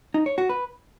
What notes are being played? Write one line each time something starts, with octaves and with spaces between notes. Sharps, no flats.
D#4
C#5
F#4
B4